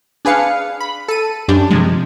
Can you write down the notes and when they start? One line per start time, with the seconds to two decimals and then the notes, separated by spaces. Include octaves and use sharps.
0.25 D4 G#4 B4 F5 C#7
0.80 B5
1.08 A4 D#7
1.48 F#2 D4 G4
1.71 C3 F3 G#3